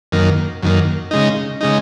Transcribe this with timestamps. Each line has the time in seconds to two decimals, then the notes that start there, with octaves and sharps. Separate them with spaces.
0.12 F#2 D#3 A#3
0.63 F#2 D#3 A#3
1.11 C#3 G#3 D#4
1.61 C#3 G#3 D#4